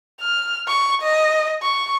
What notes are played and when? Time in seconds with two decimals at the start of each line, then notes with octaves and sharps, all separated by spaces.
0.21 F6
0.67 C#6
1.02 D#5
1.62 C#6